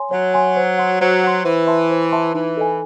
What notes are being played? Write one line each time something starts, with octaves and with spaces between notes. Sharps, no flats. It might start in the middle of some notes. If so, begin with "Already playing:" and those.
Already playing: C#5 G#5 C6
F#3 C#5
G#5 C6
C5
F#5 C6
F#3 C5
F#5 C6
E3 C5
E5 A5 C6
C5
E5 A5 C6
E3 D#4
A4 D#5 G#5